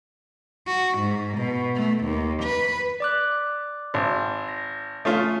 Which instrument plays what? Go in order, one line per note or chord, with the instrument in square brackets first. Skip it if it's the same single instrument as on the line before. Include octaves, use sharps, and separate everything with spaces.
[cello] F#4
G#2
B2
A3
D#2
B4
[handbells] D5 D6 F#6
[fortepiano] G#1
[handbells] A#6
[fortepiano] A3 C#4 F4 [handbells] D#6